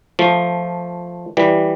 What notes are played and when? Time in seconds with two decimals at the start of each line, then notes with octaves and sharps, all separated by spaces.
0.19 F3 A3
1.37 E3 G3